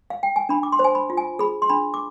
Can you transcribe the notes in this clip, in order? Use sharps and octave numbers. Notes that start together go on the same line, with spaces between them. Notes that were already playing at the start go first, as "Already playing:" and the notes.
F5
G5
G#5
D4 B5
D6
C6
C5
G#5
B5
F4
G#5
G#4 B5
C6
D4 B5
D6